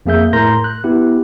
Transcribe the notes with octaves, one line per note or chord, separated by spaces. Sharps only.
F2 A#3 G#4 E5 G6
A2 A#4 A#5 C6 G6 A#6
F#6
B3 E4 G4